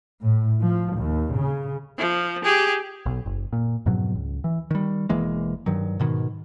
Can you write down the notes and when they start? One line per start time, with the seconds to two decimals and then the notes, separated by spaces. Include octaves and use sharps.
0.22 A2
0.60 F3
0.94 D#2
1.33 C#3
1.98 F3
2.44 G4 G#4
3.06 B1
3.26 F#1
3.53 A#2
3.86 F2 G#2 B2 F#3
4.15 C#2
4.44 E3
4.71 D#3 G3
5.09 E1 E3 G#3 A#3
5.66 G2 D#3 F#3
5.99 G#2 B2 D#3